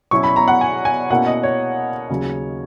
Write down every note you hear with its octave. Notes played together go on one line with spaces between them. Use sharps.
B2 F#3 C#4 E4 C#6
B5
A#5
F#5
G#5
G#5
B2 A#3 C#4 E4 F#5
D#5
C#5
D#2 C#3 F#3 C#4